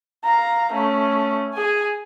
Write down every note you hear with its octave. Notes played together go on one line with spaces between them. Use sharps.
F5 A#5
A3 C#4
G#4 G#5